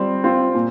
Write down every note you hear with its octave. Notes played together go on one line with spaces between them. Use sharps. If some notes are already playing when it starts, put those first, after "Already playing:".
Already playing: G3 C4 F4
C4 F4
A#2